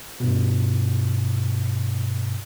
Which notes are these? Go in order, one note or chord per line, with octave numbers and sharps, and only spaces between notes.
G2 B2